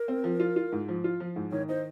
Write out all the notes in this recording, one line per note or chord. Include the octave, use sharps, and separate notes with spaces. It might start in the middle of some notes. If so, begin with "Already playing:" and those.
Already playing: A#4
C4
F3
F4
F4
G#2
F3
F4
F3
G#2
D#3 C#5
D#4 C5